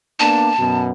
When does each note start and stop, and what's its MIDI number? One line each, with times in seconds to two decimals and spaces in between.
0.20 0.50 58
0.20 0.50 59
0.20 0.50 62
0.20 0.81 81
0.59 0.92 42
0.59 0.92 47
0.59 0.92 59